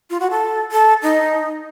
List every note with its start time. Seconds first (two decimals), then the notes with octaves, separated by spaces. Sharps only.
0.10 F4
0.20 F#4
0.31 A4
0.72 A4
1.03 D#4